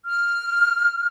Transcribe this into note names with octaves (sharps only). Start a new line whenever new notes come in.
F6